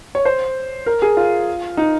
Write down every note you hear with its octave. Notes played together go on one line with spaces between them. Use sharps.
C#5
C5
A#4
G#4
F4
D#4